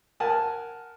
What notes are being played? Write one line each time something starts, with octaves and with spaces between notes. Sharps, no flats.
A#4 F#5 G#5 A5